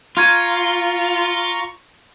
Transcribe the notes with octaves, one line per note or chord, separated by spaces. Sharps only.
F4 A#5 C#6 F6 G#6 D#7